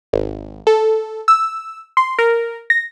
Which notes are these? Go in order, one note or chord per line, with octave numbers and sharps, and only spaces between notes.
G#1
A4
E6
C6
A#4
A#6